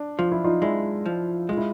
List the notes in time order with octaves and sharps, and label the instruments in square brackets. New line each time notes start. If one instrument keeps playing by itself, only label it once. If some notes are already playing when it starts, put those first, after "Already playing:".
Already playing: [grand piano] D4
[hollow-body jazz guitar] F3 [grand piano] F4
[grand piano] E4
D#4 F4
[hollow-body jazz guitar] G#3 [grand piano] D4 E4
[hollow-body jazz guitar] F3
[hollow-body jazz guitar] G#3 [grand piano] F4
[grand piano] E4